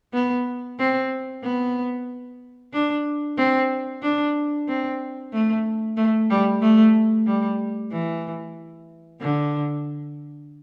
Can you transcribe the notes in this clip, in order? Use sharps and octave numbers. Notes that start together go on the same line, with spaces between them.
B3
C4
B3
D4
C4
D4
C4
A3
A3
G3
A3
G3
E3
D3